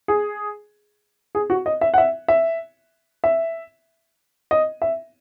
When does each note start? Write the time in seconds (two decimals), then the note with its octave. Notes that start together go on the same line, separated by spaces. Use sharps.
0.08 G#4
1.35 G#4
1.50 F#4
1.66 D#5
1.81 E5
1.94 F#5
1.98 E5
2.28 E5
3.24 E5
4.51 D#5
4.82 E5